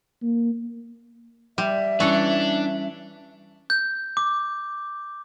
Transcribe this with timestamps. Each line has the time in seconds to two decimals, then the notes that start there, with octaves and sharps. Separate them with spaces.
0.22 A#3
1.58 G3 E5
2.00 E3 G3 C#4 D4 A4 C#5
3.70 G6
4.17 D6